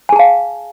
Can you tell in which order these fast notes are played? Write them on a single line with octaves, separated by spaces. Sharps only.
G#5 G#4 A5 F5